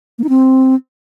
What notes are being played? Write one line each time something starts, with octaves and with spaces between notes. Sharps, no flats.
A#3
D#4
C4